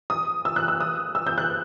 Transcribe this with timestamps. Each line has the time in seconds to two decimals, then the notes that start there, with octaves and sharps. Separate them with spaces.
0.10 D#6
0.45 E6
0.56 F#6
0.68 E6
0.80 D#6
1.15 E6
1.27 G6
1.38 F#6